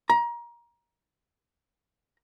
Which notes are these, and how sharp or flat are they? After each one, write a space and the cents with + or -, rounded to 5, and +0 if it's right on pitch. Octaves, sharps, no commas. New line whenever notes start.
A#5 +25